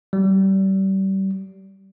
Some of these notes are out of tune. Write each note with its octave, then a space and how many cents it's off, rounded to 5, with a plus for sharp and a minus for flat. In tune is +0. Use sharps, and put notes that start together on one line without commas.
G3 -30